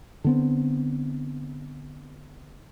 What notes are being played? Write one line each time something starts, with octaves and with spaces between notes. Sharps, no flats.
D3 B3 C4